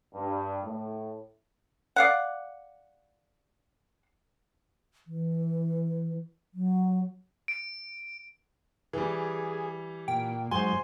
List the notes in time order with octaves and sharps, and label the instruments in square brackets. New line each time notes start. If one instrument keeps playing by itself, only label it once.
[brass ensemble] G2
A2
[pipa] D5 F5 F#5
[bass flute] E3
F#3
[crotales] D7
[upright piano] E3 G3 [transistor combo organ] G#4
[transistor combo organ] A#2 [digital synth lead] G5
[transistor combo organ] G#2 F#3 [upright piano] C5 G#5 [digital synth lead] C6